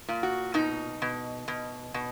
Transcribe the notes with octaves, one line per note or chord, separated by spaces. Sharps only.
A#2
F#4
B2 D#4
B2
B2
B2